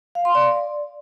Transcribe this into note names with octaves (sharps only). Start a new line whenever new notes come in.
F5
C6
D5